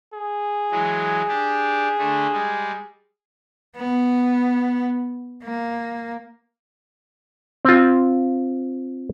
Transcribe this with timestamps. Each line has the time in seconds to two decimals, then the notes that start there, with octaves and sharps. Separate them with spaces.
0.13 G#4
0.71 E3 F#3 G#3
1.28 D4 G4
1.98 D3 A3
2.33 G3 G#3
3.77 B3
5.44 A#3
7.65 C4 F4